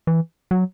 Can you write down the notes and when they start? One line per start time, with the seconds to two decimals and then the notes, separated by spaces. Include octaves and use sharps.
0.07 E3
0.51 F#3